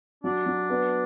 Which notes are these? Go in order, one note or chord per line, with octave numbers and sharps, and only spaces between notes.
F#3 D4
F#3
B3